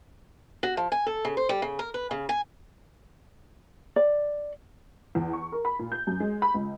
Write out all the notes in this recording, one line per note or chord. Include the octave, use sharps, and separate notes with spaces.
F#4
F3
G#5
A4
C#3
C5
G3
C#3
A#4
B4
C#3
G#5
D5
E2
C#6
A#4
B5
A#2
G6
F#2
G#3
B5
C#2